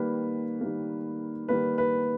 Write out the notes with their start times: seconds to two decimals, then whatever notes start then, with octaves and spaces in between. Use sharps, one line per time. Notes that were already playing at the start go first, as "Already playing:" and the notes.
Already playing: D#3 G3 A#3 B4
0.61 D#3 G3 A#3
1.48 D#3 G3 A#3 B4
1.78 B4